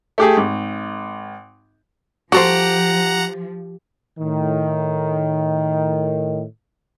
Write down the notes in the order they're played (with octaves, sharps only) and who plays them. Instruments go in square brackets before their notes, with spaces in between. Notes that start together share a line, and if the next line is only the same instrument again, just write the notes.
[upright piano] A3 G4 G#4
G#1
[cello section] F3 [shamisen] F#4 A4 C5 [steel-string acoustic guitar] G4 [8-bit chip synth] F#5 A#5
[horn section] A2 D#3